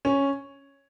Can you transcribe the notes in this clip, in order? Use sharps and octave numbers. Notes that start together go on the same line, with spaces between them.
C#4